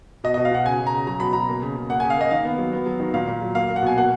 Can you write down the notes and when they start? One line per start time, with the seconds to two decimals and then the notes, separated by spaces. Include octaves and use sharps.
0.24 B2 D#5
0.34 B2 D#5
0.45 F5
0.51 B2 F#5
0.65 C#3 G#5
0.79 C#3
0.87 A#5
0.93 C#3
1.07 F#3 A#5
1.20 B2 B5
1.33 B2 A#5
1.48 A#3
1.62 C#3
1.75 C#3
1.90 A#3 F#5
2.00 C#3 G#5
2.10 F5
2.17 A#3 D#5
2.31 D#3 F5
2.45 B3
2.58 F#3
2.72 B3
2.86 F#3
3.00 D#3
3.14 A#2 F5
3.28 A#2
3.42 F#3
3.55 A#3 F5
3.69 A#3
3.76 F#5
3.83 B2 G#5
3.97 A#3 F#5